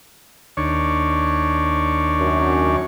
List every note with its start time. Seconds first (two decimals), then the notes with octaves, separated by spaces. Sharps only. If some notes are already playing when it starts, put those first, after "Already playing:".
0.57 D#2 D4 C#5
2.21 F#2